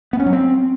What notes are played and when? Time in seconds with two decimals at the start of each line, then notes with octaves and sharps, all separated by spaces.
0.13 B3
0.20 C#4
0.26 F#3
0.33 C4